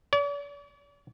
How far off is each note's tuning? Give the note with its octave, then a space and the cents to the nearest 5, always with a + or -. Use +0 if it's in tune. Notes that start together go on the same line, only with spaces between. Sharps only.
D5 -45